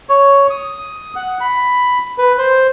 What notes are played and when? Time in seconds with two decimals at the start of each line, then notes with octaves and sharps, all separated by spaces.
0.09 C#5
0.50 D#6
1.16 F#5
1.41 B5
2.18 B4
2.38 C5